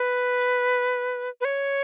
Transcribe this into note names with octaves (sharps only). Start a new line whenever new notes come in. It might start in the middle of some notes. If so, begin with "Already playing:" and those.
Already playing: B4
B4
C#5